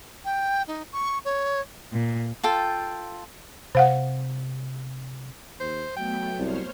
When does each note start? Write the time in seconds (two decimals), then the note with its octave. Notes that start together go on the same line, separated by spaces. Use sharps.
0.25 G5
0.67 D#4
0.92 C#6
1.25 C#5
1.92 A#2
2.43 F4 A4 G5
3.75 C3 C5 F5 F#5
5.60 D#2 C5
5.96 F#3 A3 B3 G5
6.39 C2 C5 C#5 F6